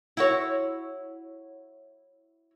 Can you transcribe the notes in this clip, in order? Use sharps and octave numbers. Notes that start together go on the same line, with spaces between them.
E4 F#4 C#5